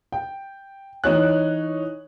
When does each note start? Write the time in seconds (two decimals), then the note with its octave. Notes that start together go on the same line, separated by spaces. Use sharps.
0.12 G5
1.04 E3 D#4 C#5 F#6